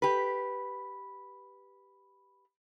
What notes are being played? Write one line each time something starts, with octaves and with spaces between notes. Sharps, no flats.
G4 B4